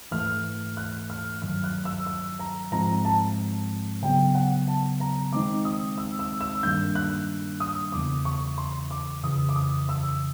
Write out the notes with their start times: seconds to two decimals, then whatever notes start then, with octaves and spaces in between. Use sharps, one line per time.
0.12 G#2 E3 A3 F6
0.77 F#6
1.10 F6
1.42 G2 D#3 F#3 F6
1.64 F#6
1.85 E6
2.07 E6
2.40 A#5
2.71 G#2 F3 G#3 C4 A#5
3.05 A5
4.02 C#3 F#3 B3 G5
4.35 F#5
4.68 A5
5.00 A#5
5.32 D#3 G#3 C4 D#4 D6
5.65 D#6
5.98 E6
6.19 E6
6.41 E6
6.63 G2 D#3 G3 A#3 D4 G6
6.95 F#6
7.60 D#6
7.92 E2 C#3 E3 D6
8.25 C#6
8.58 C6
8.91 D6
9.23 F2 C#3 E3 D#6
9.49 D6
9.56 D#6
9.89 E6